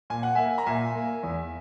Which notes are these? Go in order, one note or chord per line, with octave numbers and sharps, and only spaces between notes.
A#2 G#5
F#5
A#3 E5 G#5
A#5
A#2 E5 G#5
A#3
E2